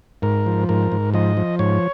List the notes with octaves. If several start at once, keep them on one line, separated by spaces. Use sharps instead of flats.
G#2 A#4
F3
G#2 A#4
G#2
F3 D#5
F3
G#2 C#5